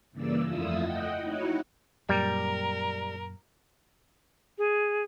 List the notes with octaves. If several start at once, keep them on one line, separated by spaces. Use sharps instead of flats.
G2 C#3 E3 A#3 D5 E6
F2 A3 E4 F4 D#6 E6
D#5 F#5 G5
D#4 E4 F#4 C#5 F#5
F#2 A#2 G3 A#4
G#4